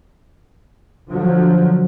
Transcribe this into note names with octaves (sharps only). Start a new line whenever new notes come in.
D3 F3 F#3